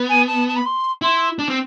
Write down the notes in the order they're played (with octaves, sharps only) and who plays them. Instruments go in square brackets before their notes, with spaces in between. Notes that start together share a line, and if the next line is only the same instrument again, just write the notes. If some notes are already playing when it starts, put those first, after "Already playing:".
Already playing: [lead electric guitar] B3
[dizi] G#5
A5
A5
B5
C6
[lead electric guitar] E4 [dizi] C6
[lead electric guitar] D4
C4